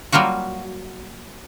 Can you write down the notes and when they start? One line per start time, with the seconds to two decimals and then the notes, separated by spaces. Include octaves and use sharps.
0.12 F#3 G3 A#3 F4 F#4